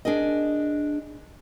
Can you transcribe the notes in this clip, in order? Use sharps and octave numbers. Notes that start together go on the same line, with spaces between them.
D4 G#4 A#4 D#5